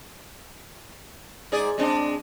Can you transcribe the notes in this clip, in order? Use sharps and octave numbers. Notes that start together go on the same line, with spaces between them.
G#2 G#4 D5
G#3 C4 D4